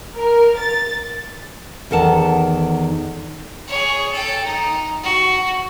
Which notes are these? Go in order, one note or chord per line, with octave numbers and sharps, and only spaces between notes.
A#4
A6
E2 D#3 A4 F#5 A5
G#4 C#5
A4 G5
D#4
F#4